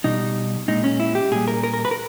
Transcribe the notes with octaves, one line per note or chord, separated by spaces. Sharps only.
B2 G3 D#4
A#2 G#3 D#4
C#4
E4
G4
A#2 G3 G#4
A#4
A#4
A#4
B4
A#4